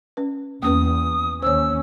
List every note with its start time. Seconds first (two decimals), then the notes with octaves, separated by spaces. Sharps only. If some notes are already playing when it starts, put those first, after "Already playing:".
0.17 C#4 B4
0.62 E2 A#3 C#4 B4 D#6
1.42 D#2 C#4 C5 C#5 E6